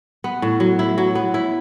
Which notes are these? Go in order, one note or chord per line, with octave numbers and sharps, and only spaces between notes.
B3
A2
F#3
E4
F#3
B3
E4